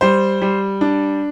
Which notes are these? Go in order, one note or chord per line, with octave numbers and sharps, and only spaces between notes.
G3 C5
G3
D4